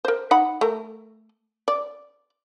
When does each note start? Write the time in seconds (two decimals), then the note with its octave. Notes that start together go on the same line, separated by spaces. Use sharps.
0.05 A#4 C5
0.31 D#4 F#5 B5
0.61 A3 A#4
1.68 D5